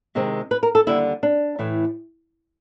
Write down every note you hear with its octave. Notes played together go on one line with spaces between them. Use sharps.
C3 D#3 G#3 C4
B4
A#4
A4
D#2 D3 G3 E4
D4
A2 E3 A3